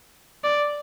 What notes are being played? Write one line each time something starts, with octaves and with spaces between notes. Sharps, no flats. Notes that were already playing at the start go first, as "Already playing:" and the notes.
D5